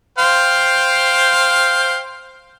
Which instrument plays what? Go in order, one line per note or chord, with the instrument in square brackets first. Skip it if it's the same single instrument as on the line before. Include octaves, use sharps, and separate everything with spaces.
[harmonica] C5 F5 G5